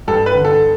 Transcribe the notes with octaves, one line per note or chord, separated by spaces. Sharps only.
G2 A4
B4
D3
A4